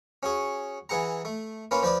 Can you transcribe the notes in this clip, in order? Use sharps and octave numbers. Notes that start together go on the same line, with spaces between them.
C#4 F#4 G#4
E3 G#4 F#5 A#5
A3
A#3 C#4 F4 B4
F3 B4 D5 D#6